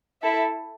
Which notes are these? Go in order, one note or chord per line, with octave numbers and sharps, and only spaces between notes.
E4 A4 E5